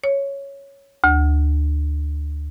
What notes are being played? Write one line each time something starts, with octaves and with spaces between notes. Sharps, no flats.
C#5
D2